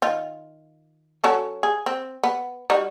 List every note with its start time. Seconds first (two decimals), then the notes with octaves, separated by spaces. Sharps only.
0.02 D#3 F4
1.24 F#3 C#4 A4
1.63 G#4
1.86 C4
2.24 B3
2.70 G3 D#4 F#4